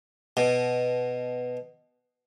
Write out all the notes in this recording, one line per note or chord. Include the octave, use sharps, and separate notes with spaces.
B2